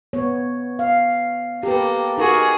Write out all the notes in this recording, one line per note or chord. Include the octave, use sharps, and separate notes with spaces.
B3 C#5
F5
A#3 G4 A4 B4
D#4 F#4 G#4 A#4